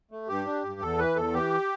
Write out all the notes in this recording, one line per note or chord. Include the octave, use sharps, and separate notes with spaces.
A3
G2 G4
D4
G2
E2 A4
E3 B4
E2 A4
E3 G4